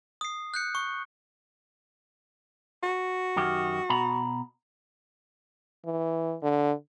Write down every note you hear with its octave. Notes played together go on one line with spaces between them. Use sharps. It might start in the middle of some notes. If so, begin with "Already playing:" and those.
D#6 C7
F#6 G6 C#7
C#6
F#4
F#2 D#3 G4
B2 A#5 B5
E3
D3